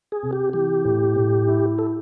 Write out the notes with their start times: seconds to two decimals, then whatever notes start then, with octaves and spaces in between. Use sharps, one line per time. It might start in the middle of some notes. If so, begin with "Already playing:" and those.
0.12 G#4
0.23 C3
0.33 G4
0.53 E3 G4
0.85 A2
1.16 A2
1.47 E4
1.79 A4